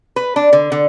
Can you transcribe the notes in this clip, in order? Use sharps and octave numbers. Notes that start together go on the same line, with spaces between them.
B4
D4
D3
D3